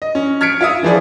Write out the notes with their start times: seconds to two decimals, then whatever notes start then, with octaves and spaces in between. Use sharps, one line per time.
0.02 D#5
0.15 C#4
0.41 F6 G#6 B6 C#7 D7
0.61 F4 E5 D#6
0.83 E3 F3 G#4 D5